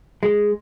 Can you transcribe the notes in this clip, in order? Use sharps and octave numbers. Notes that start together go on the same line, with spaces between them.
G#3